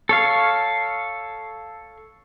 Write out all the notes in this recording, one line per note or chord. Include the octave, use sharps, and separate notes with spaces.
A4 C#5 F5